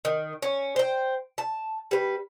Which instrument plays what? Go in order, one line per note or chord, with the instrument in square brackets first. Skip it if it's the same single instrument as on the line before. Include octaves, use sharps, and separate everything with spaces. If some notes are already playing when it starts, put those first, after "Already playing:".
[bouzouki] D#3
C#4
C5 G5
A5
G3 B4